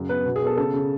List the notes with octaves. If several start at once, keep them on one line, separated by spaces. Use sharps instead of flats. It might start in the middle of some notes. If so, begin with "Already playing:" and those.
Already playing: F#2 C#3
B3 B4
B2
G#4
B3 A4 A#4
C#3 A4
C#3